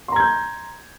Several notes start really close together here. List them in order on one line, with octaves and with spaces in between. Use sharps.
C6 A#5 G#6 G6